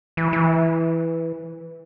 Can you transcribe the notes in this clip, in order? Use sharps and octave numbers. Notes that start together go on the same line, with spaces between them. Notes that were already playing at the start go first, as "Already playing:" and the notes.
E3
E3